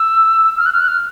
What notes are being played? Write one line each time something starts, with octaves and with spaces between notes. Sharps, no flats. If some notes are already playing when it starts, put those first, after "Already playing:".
Already playing: E6
F6
F#6
F6
F#6
F6